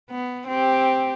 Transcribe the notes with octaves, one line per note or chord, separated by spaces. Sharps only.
B3
C4 G4